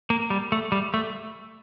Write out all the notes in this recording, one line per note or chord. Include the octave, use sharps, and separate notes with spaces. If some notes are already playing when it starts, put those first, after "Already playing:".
A#3
G3
A3
G3
A3